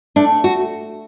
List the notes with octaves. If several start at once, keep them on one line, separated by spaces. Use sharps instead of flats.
A3 D4
F#4